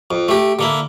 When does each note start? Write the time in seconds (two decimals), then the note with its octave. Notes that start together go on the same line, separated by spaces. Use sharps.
0.11 F2
0.28 A3 G4
0.59 D3 A#3 E4